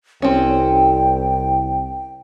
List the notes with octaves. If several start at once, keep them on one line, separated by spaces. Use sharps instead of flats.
C2 C4 C#4 G5